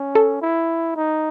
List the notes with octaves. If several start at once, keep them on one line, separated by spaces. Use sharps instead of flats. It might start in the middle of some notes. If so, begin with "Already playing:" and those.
Already playing: C#4
A4
E4
D#4